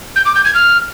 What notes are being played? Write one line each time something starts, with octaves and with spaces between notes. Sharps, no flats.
G6
D6
G6
G#6
F6